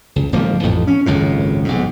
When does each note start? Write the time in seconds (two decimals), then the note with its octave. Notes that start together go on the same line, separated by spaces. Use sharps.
0.16 C#2
0.32 D1 G#2 F3 A#3
0.62 A1 F2 A2
0.87 C#4
1.06 G#1 C#2 F#2 A2
1.64 B1 G#2